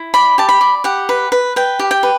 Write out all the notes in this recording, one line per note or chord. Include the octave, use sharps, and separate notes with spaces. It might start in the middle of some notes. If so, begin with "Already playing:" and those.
Already playing: E4
D5 B5
G4 A5
B5
D5
G4 F#5
B4
B4
B4 G5
G4
G5
B4